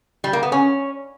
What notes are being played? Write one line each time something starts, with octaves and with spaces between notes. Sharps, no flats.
G3
A#3
B3
C#4